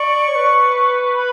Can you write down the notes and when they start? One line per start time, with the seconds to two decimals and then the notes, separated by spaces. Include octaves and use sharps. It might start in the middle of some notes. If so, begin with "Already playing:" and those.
Already playing: D5 C#6
0.28 C#5
0.35 B4
1.14 B5